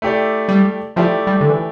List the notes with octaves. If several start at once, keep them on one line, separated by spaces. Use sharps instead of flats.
A3 E4 G4 D5
G3
F3 A3 E4 G4 D5
G3
D3
E3